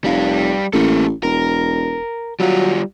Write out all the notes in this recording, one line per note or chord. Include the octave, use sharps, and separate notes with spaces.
F1 G3 F5
A1 A#3 A4
E1 A#4
F#3 G3 F4